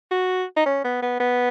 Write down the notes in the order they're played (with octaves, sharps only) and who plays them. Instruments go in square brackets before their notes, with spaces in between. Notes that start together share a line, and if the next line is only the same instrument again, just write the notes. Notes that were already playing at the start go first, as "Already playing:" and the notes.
[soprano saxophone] F#4
D#4
C#4
B3
B3
B3